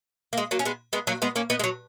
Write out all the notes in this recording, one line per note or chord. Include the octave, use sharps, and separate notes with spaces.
A#3
G#3
F#3 A#3
C#4
G#3 B3
G#3 B3
F#3 A#3
G#3 B3
A#3 C#4
B3 D#4
G#3
F#3